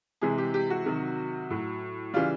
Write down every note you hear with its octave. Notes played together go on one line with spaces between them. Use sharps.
C3 E3 G#3 G#4
G4
G4
F#4
C3 D#3 F#3
A2 F#3
C#3 E3 G3 F4